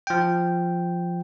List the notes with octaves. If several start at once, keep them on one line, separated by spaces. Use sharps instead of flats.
F3 G5